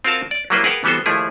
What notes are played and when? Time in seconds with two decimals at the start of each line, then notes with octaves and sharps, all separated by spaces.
0.05 C4 F4 F#4 A#4 F5 A5
0.31 D5
0.50 F#3 G3 A#3 E4 B4 C5
0.64 G#4 A#4 B4 F#5 G5 A5
0.84 E3 G3 B3 F#4 A4 C5
1.06 D#2 F3 A3 E4 G#4